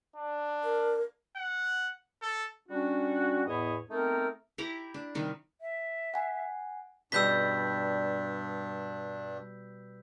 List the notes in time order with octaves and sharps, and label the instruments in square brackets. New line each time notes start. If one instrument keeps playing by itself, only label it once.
[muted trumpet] D4
[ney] A#4
[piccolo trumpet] F#5
A4
[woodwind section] G3 C#4 D4 F#4
E2 A2 B3 C#5 D#5 B5
A3 B3 C4 D#4 A4 A#4
[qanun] E4 G4 A#5 D6
D4
C3 D#3 G3
[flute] E5
[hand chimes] F#5 G#5
[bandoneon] G2 D4 [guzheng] B2 G3 [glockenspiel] E6 G6 B6